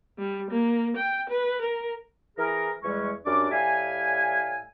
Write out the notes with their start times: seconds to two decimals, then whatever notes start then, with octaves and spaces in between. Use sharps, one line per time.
0.18 G3
0.51 A#3
0.97 G5
1.29 B4
1.61 A#4
2.38 E3 G#4 A#4
2.83 E2 E3 G3 G#3 C#4 C#6
3.26 F#2 G3 D4 D5 D6
3.52 A2 G3 E5 F5 G#5